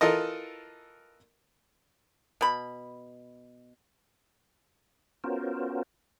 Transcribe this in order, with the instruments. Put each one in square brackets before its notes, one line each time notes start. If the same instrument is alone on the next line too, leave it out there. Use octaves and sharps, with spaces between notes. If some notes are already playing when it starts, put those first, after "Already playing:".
[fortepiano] E3 F4 A4 A#4 D#5
[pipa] B2 B5
[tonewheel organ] B3 C#4 F4 F#4 A#4 C5